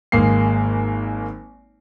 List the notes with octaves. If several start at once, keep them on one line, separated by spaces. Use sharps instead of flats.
G#1 G#3 A#3 C7